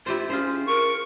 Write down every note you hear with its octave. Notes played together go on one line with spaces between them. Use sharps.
E4 F4 G4 C5
C#4 F4 G#4 C5
A#4 C#6